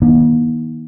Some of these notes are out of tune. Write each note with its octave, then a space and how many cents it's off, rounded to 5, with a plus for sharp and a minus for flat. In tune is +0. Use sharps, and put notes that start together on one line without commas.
D#3 +20 A#3 +45 D4 +35